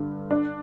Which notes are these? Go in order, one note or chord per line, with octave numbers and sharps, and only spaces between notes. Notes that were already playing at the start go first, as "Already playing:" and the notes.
Already playing: G2 D3
D4